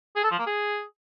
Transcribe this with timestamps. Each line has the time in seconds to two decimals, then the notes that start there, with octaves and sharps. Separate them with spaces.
0.16 G#4
0.24 A4
0.31 F3
0.39 A#3
0.47 G#4